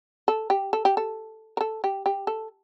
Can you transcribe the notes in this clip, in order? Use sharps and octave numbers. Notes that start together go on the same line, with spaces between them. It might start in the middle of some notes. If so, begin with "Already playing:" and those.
A4
G4
A4
G4
A4
A#4
A4
G4
G4
A4